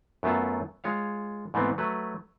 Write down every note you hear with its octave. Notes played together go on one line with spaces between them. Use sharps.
F#2 F#3 A3 B3 F4 A5
G#3 F4 C#5 F5
G#2 E3 A3 B3 C4
F#3 A3 B4